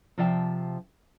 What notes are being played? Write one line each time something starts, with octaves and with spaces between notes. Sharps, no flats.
C3 F3 D5 E5 G5 A5